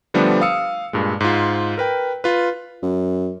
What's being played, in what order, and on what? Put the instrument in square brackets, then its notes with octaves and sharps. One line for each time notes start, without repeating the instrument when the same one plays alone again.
[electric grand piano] D3 F3 G3 A3 B3 D4
F5 D#6 E6 C#7
G2 A#2 G#3
G#2 F4
A#4 B4 G5
F4 B4
[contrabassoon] F#2